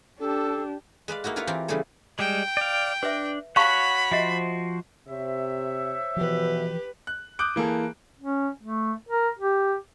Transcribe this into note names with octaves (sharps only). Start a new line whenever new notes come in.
D4 G4 A4
G#3 B4 D5 F5
A#3 D#4 E4 F#4
E4 F4 A#4 B4 C#5 F5
E3 C4 F4 G4 A#4
C#3 E3 G3 A3 G#4 A4
G3 G#3 G5
D5 F5
D4 B4 E5
F#4 C#5 F5 F#5 A5 B5 C#6
F3 F#4 C5 D#5 E5
C3 C5 C#5 E5
B2 E3 F3 G4 B4
F#6
D6 D#6 F#6 G6 D7
E3 A#3 G#4 A4
C#4
A3
A#4
G4